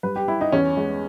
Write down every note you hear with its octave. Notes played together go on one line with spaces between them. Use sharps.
G2 B4
G4
G3 E4
D#4
E2 C#4
G#3